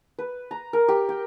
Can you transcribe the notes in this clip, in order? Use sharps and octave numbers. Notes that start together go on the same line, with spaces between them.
B4
A#5
A#4
G4
G5